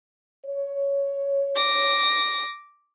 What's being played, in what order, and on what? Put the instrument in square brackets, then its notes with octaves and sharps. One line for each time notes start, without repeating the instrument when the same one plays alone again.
[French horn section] C#5
[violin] D6 A#6